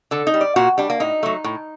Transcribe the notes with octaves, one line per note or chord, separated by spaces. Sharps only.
D3 A4
D#4
G3
D5
A#2 F#4
G3 D4
A#3
A2 D#4
F#3 A3
A2